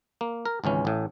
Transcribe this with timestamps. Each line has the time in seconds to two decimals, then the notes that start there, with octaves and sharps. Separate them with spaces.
0.21 A#3
0.46 A#4
0.64 G#1 C#2 E3 C#4
0.85 A1 A2